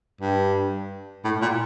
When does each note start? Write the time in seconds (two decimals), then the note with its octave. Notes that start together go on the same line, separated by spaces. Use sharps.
0.21 G2
1.24 A2
1.42 A#2